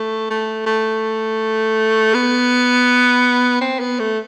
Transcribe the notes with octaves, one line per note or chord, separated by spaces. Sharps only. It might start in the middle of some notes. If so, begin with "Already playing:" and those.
Already playing: A3
A3
A3
B3
C4
B3
A3